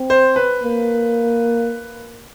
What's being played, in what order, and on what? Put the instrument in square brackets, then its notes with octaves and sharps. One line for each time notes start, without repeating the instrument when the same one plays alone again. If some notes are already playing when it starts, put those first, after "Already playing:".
Already playing: [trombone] C4
[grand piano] C5
B4
[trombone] A#3